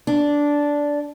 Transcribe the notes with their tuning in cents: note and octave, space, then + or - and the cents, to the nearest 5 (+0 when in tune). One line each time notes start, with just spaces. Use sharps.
D4 -10